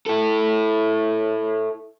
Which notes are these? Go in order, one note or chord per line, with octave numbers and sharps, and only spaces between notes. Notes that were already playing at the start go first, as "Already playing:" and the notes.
E4 A4